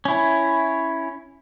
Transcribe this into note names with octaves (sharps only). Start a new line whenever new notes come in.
C#4 E4